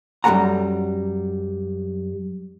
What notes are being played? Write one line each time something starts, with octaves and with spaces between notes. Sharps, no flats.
F#2 G3 A3 A4 F#5 A#5